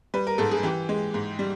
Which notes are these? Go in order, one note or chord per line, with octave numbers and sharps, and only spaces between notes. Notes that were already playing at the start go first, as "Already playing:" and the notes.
G3 B4
A#4
G#2 A4
G#4
E3 G4
G#3
G#2
G3